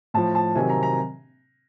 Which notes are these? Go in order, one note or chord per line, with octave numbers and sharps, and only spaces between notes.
A2 F3 A5
A5
C3 D#3 F#3 G#5
A#5
A#5